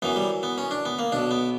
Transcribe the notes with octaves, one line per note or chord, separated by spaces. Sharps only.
F#2 E3 B3
G3
B3
C#4
D4
B3
A#3
B1 B2 D4
B3